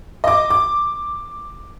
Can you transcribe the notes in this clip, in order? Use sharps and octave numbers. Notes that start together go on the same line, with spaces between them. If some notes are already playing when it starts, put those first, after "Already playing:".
D#5 D6
D6